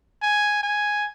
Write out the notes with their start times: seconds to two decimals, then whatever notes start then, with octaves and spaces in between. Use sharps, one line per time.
0.22 G#5
0.63 G#5